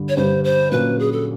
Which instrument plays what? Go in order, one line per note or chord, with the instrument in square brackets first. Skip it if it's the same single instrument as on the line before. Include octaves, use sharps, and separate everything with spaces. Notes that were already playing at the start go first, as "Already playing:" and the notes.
Already playing: [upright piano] G2 D3 G3
[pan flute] C#5
[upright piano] G2 D3 G3 [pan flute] C5
[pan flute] C5
[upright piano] A#2 F#3 A#3 C#4 [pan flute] B4
[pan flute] G#4
A4